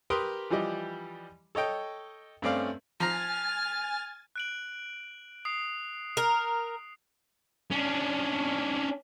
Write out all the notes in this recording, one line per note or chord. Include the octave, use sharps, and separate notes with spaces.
G4 A#4 B4 G5 C6 D#6
E3 F3 G3 G4 D#5
A4 C#5 D#5 G5
G2 A3 C4 C#4 D5 F5
F3 G#5 A#5 F6 A6
F#6 D7 F#7
D#6 C7
A#4
C#4 D4